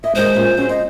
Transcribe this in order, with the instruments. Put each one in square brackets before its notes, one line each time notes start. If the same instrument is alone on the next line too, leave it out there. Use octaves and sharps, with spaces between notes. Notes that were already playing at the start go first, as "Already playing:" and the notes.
[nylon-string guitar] D#5 [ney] E5
[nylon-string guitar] D#2 D#3 D#5 [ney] G#3 [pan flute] C5
[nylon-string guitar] A#2 C#4
[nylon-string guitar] F#3 G#3 [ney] C#4
[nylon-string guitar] C5 [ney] D#5